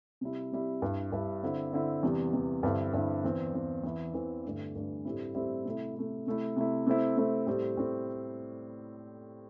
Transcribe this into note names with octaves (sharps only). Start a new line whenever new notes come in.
C3 G3 E4
C3 G3 E4
G2 G3 E4
G2 G3 E4
D3 C4 E4
D3 C4 E4
E2 C3 G3
E2 C3 G3
G2 D3 C4 E4
G2 D3 C4 E4
E2 E3 C4
E2 E3 C4
E2 E3 C4 E4
E2 E3 C4 E4
G2 D3 A3 D4
G2 D3 A3 D4
A2 G3 C4 E4
A2 G3 C4 E4
C3 A3 E4
C3 A3 E4
C3 A3 E4
C3 A3 E4
C3 A3 C4 E4
C3 A3 C4 E4
A2 G3 C4
A2 G3 C4